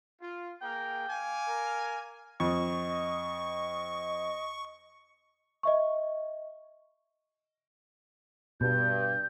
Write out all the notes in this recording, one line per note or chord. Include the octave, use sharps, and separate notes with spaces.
F4
A#3 G#4 A#4 G5
F5 G#5 D6
A#4
F2 D#5 C#6
D#5
D#5 E5 C#6
G2 B2 G6